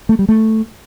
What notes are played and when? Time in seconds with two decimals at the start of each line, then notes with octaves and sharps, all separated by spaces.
0.09 A3
0.19 G3
0.29 A3